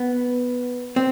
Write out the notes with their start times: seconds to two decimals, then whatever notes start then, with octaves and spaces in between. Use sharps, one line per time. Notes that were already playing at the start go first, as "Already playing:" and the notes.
Already playing: B3
0.96 C4